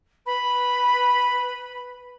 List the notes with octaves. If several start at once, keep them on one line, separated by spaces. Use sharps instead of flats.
B4 B5